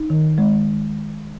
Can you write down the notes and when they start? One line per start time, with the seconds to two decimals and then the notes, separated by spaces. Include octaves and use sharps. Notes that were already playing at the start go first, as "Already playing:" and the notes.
Already playing: D#4
0.10 D#3
0.38 G#3